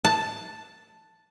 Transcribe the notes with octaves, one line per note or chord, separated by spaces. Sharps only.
A5